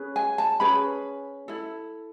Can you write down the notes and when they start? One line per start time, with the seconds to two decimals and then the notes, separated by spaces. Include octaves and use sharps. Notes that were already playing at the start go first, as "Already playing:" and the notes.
Already playing: C#4 G#4 B4
0.16 G#5
0.38 A5
0.60 C#4 G#4 B4 B5
1.48 E4 A4